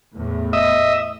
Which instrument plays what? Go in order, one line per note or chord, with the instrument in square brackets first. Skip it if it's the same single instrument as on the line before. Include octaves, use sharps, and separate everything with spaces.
[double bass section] E2 A2
[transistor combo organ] D#5 E5